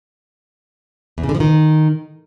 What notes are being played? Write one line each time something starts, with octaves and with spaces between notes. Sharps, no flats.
E2
C#3
D3
F3
D#3